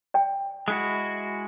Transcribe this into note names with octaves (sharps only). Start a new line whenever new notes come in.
D5 G5
G#3 E4 F#4